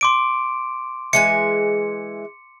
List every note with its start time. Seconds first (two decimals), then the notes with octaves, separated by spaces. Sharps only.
0.01 C6 D6 D7
1.13 E3 G#3 G#5 C#7